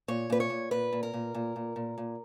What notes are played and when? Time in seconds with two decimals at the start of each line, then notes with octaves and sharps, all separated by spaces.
0.08 A#2 C#5
0.30 A#2 B4
0.40 C#5
0.50 A#2
0.71 A#2 B4
0.93 A#2
1.03 A#4
1.14 A#2
1.34 A#2
1.56 A#2
1.76 A#2
1.98 A#2